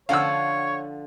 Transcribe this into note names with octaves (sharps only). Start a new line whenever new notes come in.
D3 F3 C#5 F5 F#5 E6